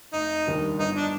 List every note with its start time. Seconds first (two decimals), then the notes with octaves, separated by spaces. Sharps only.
0.13 F1 D#4
0.46 D#2 D#3 G3 D4
0.78 G1 D#4
0.96 D4